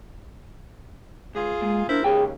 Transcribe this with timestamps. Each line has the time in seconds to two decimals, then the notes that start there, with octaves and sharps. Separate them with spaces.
1.35 C#2 F4 G#4
1.61 A#2 G#3
1.89 D4 E4 A#4 C5
2.04 D#2 G#2 C#3 G#3 G#4 G5